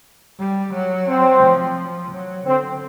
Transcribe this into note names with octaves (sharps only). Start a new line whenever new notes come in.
G3
F#3
C4
F3
F#3
D3 C4